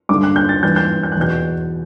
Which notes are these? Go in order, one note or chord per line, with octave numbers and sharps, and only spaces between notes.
G2 D3 D6
F#6
G6
A6
G2 E3 G6
G6
G6
F#6
E2 B2 G6